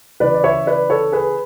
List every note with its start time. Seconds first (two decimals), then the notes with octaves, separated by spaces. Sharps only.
0.20 C#3 E3 B4 D5
0.34 D5
0.44 C#5 E5
0.67 B4 D5
0.90 A4 C#5
1.12 G#4 B4